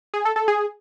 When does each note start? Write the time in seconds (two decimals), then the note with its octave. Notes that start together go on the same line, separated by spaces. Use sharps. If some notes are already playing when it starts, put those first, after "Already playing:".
0.14 G#4
0.25 A4
0.36 A4
0.48 G#4